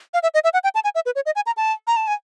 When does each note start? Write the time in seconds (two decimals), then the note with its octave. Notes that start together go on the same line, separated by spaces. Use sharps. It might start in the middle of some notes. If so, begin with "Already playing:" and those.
0.14 F5
0.23 E5
0.34 D#5
0.44 E5
0.53 F#5
0.64 G5
0.75 A5
0.84 G#5
0.95 E5
1.06 B4
1.15 C#5
1.26 D#5
1.36 G#5
1.46 A#5
1.57 A5
1.87 A#5
1.96 A5
2.07 G#5